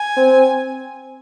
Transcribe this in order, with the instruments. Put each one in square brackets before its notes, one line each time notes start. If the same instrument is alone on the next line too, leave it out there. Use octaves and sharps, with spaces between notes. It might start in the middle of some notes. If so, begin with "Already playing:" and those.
Already playing: [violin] G#5
[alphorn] C4